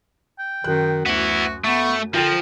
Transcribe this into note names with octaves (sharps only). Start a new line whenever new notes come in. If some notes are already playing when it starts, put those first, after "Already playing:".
G5
F#2 D#3 F#6
D2 B3 E4 F#4
A3 B3 C#6
D3 F3 F4 A#4 G5 A6